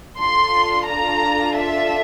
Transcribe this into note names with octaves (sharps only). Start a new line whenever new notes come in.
D4 F4 A4 C6
A#5
E5